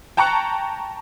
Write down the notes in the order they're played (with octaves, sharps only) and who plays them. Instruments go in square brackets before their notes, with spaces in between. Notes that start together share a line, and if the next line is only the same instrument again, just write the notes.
[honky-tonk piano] G5 A5 A#5 C#6 F#6 C#7